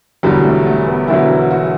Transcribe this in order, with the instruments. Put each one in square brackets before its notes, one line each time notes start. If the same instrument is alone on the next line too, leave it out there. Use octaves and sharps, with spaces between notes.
[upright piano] E1 E2 D3 F#3 G3
A3
A3
B3
E1 E2 D3 F#3 E4
F#4